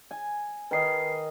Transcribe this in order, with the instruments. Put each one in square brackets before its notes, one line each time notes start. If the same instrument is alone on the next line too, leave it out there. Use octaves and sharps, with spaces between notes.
[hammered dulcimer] G#5
[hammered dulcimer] D#3 D#5 [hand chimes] B4 C7